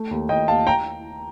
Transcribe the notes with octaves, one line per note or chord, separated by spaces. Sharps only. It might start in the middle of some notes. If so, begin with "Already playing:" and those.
Already playing: A3
D#2
D#2 D#5 G5
D#2 F5 A5
G5 A#5